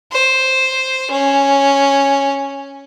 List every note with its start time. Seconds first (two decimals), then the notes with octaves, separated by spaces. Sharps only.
0.12 C5
1.11 C#4